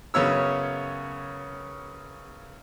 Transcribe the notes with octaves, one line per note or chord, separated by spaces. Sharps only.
F#2 C#3 B3 C#5 E6